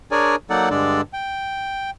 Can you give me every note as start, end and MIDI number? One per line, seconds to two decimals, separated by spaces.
0.11 0.36 62
0.11 0.36 68
0.11 0.36 70
0.11 0.36 73
0.11 0.36 74
0.11 0.36 80
0.50 0.69 54
0.50 0.69 58
0.50 0.69 63
0.50 0.69 69
0.50 0.69 74
0.50 0.69 78
0.70 1.01 43
0.70 1.01 50
0.70 1.01 56
0.70 1.01 62
0.70 1.01 69
0.70 1.01 74
1.13 1.90 79